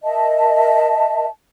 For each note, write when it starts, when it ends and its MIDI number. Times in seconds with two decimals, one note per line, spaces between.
0.03 1.26 70
0.03 1.26 75
0.03 1.26 76
0.03 1.26 81